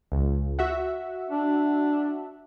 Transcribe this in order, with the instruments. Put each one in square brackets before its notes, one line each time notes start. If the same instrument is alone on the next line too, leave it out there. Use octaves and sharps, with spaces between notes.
[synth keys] C#2
F#4 E5 F#5
[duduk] D4